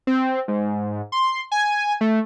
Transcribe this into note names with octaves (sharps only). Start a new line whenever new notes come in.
C4
G#2
C6
G#5
A3